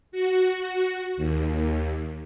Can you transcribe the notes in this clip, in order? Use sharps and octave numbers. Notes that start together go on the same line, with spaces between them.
F#4
D#2